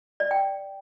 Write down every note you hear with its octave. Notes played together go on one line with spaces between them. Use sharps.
D5
G5